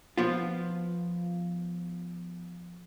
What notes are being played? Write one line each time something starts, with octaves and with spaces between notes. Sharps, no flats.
F3 B3 F4